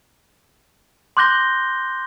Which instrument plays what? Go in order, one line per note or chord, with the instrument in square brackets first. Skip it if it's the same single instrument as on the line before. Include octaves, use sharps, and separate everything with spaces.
[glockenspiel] C6 D6 F#6 G6 A#6 G7